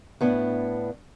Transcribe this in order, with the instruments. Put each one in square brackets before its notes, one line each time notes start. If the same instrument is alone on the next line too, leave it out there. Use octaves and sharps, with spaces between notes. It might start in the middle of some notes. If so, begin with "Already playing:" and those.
[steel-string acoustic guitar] A2 B3 D4